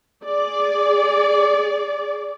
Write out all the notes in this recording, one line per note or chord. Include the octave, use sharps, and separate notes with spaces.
G#4 D5